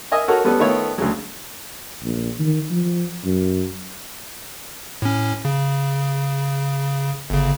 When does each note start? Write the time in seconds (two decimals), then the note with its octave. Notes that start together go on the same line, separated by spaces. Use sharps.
0.12 A#4 D#5 E5 G#5
0.28 F#4 A4 A#4 C#5 F#5
0.45 G3 B3 C#4 A4 B4
0.60 D#3 A3 B3 F4 A4 C#5
0.98 D2 C#3 F#3
2.03 A#1
2.39 D#3
2.71 F3
3.24 F#2
5.02 A2 C#4
5.45 C#3
7.30 G1 C#3